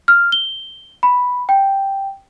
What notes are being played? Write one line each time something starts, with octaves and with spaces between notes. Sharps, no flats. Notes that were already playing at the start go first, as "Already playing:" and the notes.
F6
G7
B5
G5